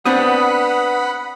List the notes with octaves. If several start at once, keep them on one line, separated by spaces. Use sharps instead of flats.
B3 C4 D4 F#5 B5 D#6